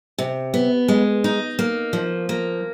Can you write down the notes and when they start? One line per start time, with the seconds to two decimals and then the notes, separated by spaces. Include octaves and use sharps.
0.18 C3
0.54 B3
0.88 G#3
1.24 D#4
1.59 A#3
1.93 F3
2.29 A#3